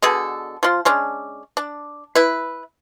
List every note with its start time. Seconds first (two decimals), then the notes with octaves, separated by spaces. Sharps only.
0.02 B2 D3 G#4 A4
0.63 F3 F4
0.85 G#3 C#4 D4
1.57 D4
2.15 E4 B4